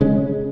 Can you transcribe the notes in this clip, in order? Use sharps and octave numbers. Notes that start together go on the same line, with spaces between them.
C#3 G#3 C#4